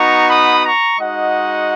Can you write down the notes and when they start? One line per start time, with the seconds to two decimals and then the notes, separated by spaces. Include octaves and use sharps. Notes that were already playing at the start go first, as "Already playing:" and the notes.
Already playing: B3 D#4 F#4 A#5 C#6
0.29 B5 D#6
0.64 A#5 C#6
0.99 G#3 D#4 F#4 D#5 F#5